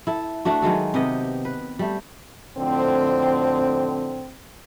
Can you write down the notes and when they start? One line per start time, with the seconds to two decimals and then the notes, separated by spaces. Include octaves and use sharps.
0.07 E4 A4
0.45 A3 D4 F#4
0.62 D#3 F#3 G#3 A4
0.94 C3 B3 G4 D#5
1.45 B4
1.79 G3 A3
2.58 F2 A2 D3 C4